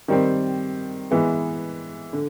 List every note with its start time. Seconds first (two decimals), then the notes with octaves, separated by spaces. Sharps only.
0.08 D#3 G3 C4
1.11 E3 G#3 B3
2.13 D3